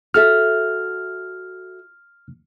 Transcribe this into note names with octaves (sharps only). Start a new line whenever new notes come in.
F#4 A4 E5 F6